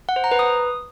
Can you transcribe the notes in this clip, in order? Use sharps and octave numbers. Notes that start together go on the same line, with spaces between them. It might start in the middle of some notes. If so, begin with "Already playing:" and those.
F#5
C5
A#5
B4
D#6